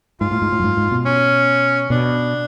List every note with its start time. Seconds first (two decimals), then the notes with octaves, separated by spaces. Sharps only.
0.21 G#2 F4
0.31 A2
0.42 G#2
0.52 A2
0.60 F#2
0.63 G#2
0.77 G#2
0.92 B2
1.05 C#4
1.90 B2 D4